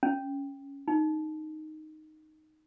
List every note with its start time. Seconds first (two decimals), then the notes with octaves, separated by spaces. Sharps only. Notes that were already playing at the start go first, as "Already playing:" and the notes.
0.03 C#4
0.88 D#4